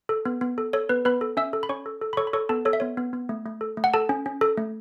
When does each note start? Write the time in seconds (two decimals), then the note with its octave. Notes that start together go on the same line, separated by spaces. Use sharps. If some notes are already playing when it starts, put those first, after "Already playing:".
0.09 A4
0.25 B3
0.41 B3
0.58 A4
0.73 A4 C#5
0.89 B3 B4
1.05 B3 B4 B5
1.21 A4
1.37 C#4 E5 E6
1.53 A4
1.63 B5
1.69 C#4 C#5 C#6
1.86 A4
2.02 A4
2.13 B5
2.17 A4 C#5 C#6
2.27 B5
2.33 A4 C#5 C#6
2.49 B3 A4 A5
2.65 A4 C#5
2.73 E5
2.80 B3 C#5
2.97 B3
3.13 B3
3.29 A3
3.46 A3
3.61 A4
3.77 A3
3.84 F#5
3.94 A4 A5
4.09 C#4
4.26 C#4
4.41 A4
4.57 A3